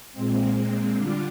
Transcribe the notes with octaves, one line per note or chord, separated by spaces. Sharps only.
A#2 G#3 C4
D3 G3 D4 F4